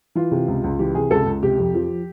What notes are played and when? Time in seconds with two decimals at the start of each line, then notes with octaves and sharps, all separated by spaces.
0.15 E3 F4
0.31 C3
0.48 C#2
0.64 C#2
0.79 E3 G4
0.95 C3 G#4
1.11 C#2 A4
1.26 C#2
1.43 C3 G4
1.58 F2
1.74 F3